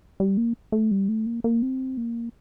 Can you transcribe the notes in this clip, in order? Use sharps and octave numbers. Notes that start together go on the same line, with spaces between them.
G3
A#3
A3
G3
A3
A#3
A#3
C4
A#3